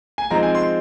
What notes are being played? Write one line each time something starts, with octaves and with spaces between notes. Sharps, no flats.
G#5
F3 G#3 C4 D#4 A#5
G#5
C6